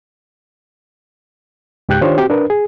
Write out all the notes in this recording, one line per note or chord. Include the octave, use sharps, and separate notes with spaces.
C#2 G#2 G4 G5 F#6 G6
D#3 D4 F4 G4 C5 C#5
C4 F#4 G4
D4 A#4 B4
G#4